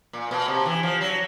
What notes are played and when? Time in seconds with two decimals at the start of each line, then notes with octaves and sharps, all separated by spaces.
0.13 A#2
0.31 B2
0.48 C3
0.66 E3
0.83 F3
1.01 F#3